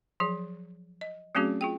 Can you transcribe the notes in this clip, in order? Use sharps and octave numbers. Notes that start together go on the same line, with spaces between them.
F3 F#3 G#4
D#5
F#3 A3 C4 C#4 F#4 G#4
F4 G#4 G5